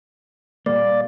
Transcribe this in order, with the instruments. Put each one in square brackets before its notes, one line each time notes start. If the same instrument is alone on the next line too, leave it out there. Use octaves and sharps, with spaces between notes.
[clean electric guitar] A#2 G3 A#3 [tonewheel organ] D5